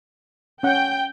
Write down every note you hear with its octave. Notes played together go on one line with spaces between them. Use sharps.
C#4 F#5 G5